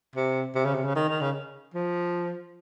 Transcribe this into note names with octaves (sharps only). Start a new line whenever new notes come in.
C3
C3
C#3
C3
C#3
D#3
D#3
C#3
F3